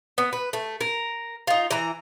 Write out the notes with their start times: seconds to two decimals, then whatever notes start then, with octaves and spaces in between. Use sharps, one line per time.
0.18 B3
0.33 B4
0.53 A3
0.81 A#4
1.47 D#4 F4
1.71 E3 A#5